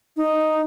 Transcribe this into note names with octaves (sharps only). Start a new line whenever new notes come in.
D#4